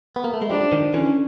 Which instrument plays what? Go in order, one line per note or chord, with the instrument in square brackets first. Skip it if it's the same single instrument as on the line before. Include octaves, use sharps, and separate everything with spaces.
[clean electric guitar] B3
A#3
A3
G#3
[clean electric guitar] F3 G3 [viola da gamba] D4
[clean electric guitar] D#3 F3
[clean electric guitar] D3 E3 [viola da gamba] C#4